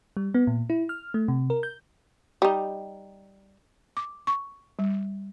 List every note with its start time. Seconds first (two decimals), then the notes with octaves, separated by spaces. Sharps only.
0.17 G3
0.35 B3
0.47 A#2
0.70 E4
0.89 F6
1.14 A3
1.28 C3
1.50 A#4
1.63 G6
2.42 G3 D#4
3.97 D6
4.27 C#6
4.79 G3